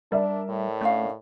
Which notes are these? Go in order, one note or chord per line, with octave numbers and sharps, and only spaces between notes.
G3 D4 A#4 D5 E5
A2
A3 C#4 D4 F5